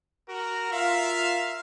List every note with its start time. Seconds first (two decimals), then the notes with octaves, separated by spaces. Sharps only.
0.28 F#4 A#4
0.71 F4 A#4 E5 F5